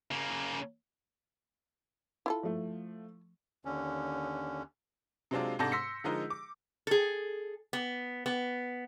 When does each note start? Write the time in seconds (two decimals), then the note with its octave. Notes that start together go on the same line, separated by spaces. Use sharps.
0.11 C#3 A#3
2.26 E4 F4 A4
2.43 F3 A3
3.65 D#2 D3 C#4
5.31 C3 F#3 G#3 C4 D4 F4
5.59 G#2 C3 D4 A4 G6 A#6
5.72 C6 E6 A#6 B6 C#7
6.04 D3 F3 G#3 D#4 A#4
6.30 D6
6.87 G#4 A4
7.73 B3
8.26 B3